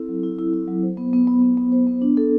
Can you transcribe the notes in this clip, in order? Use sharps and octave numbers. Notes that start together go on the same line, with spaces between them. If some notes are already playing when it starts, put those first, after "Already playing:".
Already playing: C4 E4 A4
F#3
E4
E4
E4
F#3
C5
B3
B3
B3
B3
B3
C5
B3
D4
A4